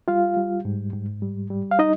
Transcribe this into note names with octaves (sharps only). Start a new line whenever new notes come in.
G3 F4 F5
G3
G#2
G#2
G3
G3
F5
D#4 D#5